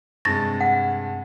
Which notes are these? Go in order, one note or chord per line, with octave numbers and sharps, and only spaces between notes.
G2 C3 G#3 C#6 A6 A#6
F#5